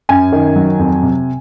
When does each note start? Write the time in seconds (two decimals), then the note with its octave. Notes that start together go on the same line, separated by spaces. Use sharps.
0.09 F#2 G#5
0.32 D#3
0.56 F#3
0.79 F2
1.03 C3